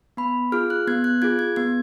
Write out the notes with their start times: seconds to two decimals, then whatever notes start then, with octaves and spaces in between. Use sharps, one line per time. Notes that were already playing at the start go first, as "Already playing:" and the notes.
0.17 B3 B5
0.52 F4 G#4 F6
0.70 F#6
0.88 B3 G#6
1.04 F#6
1.22 F4 G#4 G#6
1.39 G#6
1.56 B3 G#6